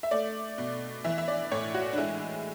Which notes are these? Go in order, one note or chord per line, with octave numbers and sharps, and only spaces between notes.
E5
A3 D5
B2
E3 E5
E5
D5
A2 C#5
F#4
D4
G#3 E4